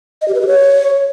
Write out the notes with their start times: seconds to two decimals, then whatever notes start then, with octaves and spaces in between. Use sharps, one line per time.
0.22 D#5
0.28 G4
0.35 B4
0.41 G4
0.48 C#5